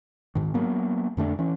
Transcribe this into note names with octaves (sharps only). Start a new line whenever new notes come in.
G#2 D#3
F#3 A#3 B3
F2 D3 A3 D4
E3 C#4